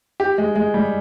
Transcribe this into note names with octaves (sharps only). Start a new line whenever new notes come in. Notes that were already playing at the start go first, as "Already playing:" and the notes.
G4
G#3
G#3
G3